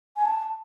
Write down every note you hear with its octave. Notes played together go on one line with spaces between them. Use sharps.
G#5
A5